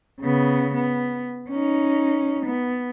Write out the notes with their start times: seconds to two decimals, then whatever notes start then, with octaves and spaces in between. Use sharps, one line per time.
0.21 C#3 B3
0.75 B3
1.50 C#4 D#4
2.46 B3